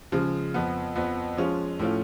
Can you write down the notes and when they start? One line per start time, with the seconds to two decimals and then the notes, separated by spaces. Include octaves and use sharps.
0.12 C#3 F3 G#3
0.54 F2 F3 B3
0.96 F2 F3 B3
1.37 F3 G#3 C#4 F4
1.79 A2 F3 A3 C#4 F4